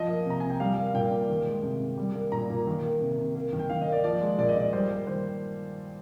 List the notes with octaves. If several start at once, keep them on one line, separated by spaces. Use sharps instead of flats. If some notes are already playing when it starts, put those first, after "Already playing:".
Already playing: F3 D#5
A#3
C3 A#5
C3 G#5
G5
G3 F5
A#3
F5
A#2 G5
A#2
D#3
G#3
C3
C3
G3
A#3
A#2 A#5
A#2
D#3
A#3
C3
C3
A#3
D#3
G5
D#3 F5
D#5
A#3
D5
F3 D5
G#3
A#2 D5
D#5
A#2 D5
G3 C5
A#3
D#3 C5